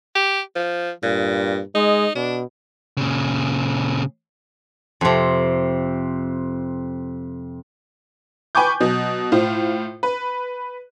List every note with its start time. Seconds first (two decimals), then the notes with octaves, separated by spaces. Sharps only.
0.15 G4
0.56 F3
1.03 G2 A#2
1.75 G#3 D#4
2.16 B2 D4
2.97 A#2 C#3
5.01 F2 C3
8.55 B4 G5 G#5 C#6 D6 G6
8.80 B2 F#3
9.32 A2 F4 C5
10.03 B4